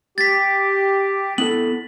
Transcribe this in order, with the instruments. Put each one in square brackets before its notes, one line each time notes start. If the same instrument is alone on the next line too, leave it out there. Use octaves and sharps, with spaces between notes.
[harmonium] G4 [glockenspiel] A6 B6
[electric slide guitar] B3 E4 A4 [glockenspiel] F#7